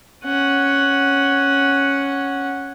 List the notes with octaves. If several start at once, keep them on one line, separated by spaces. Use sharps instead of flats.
C#4 F#5